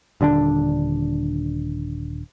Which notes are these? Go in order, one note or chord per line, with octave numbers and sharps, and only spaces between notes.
D#1 D3 C#4 D4